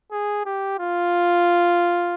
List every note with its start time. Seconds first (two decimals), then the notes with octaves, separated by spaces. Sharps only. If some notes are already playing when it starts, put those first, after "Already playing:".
0.12 G#4
0.45 G4
0.79 F4